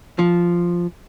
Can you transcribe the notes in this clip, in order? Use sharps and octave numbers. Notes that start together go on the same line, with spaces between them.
F3